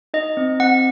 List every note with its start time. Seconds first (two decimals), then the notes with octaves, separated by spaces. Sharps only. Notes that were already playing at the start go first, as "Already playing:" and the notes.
0.14 D#4 D#5
0.37 C4
0.60 C4 F#5